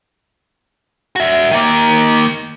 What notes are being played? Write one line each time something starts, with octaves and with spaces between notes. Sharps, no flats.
F#4 E5
D#3 A#3